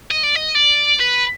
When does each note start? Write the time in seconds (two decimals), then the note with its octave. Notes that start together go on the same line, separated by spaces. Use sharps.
0.11 D#5
0.24 D5
0.36 D#5
0.55 D5
1.00 B4